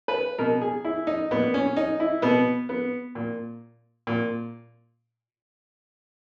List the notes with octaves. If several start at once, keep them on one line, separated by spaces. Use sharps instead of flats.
B4
B2 A#4
G#4
E4
D#4
A#2 B3
C#4
D#4
E4
B2 B3
B3
A#2
A#2